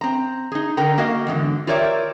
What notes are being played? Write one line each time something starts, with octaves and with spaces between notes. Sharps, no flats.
C4 A#5
D#4 G#4
D3 A#4 G5 A#5
A#3 F#4 A#4 D#5 F5
E2 G#2 D3
F4 G4 A#4 C#5 D5 E5